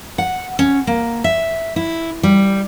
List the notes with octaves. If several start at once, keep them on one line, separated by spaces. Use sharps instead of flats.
F#5
C#4
A#3
E5
E4
G3